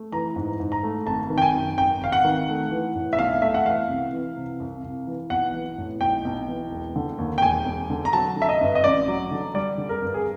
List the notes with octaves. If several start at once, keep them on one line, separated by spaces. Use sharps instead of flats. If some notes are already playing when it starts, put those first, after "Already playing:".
Already playing: A3
E3 A#5
G#2
G#2
A#5
A3
G#1 A5
D#3
G5
G#5
F#2
G#1 G5
G#1 F5
F#5
D#3
A3
E3
A2
E5
B1 F5
A3 E5
F#5
E3 F5
C2
E3
C3
C2
C2
E3
B1 F#5
E3
A2
B1 G5
B1
E3
E1
D3
D#2
G5
E1 G#5
E1
D3
A#5
F#3 A5
D3
E5
D#5
G2
D#5
A1 D5
F#3
D3
G3 D5
D3
A#4
G2
G#4